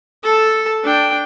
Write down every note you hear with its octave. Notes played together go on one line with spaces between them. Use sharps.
A4 A5
D4 G5